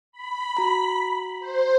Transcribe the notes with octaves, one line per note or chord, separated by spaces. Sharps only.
B5
F#4 A#5
C5